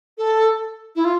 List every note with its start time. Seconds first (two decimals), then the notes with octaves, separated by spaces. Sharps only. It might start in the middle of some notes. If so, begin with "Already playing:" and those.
0.17 A4
0.95 E4
1.04 F4